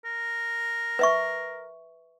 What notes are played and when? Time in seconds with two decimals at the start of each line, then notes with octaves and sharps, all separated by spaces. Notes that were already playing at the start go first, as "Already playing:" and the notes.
0.05 A#4
0.99 B4 E5 C#6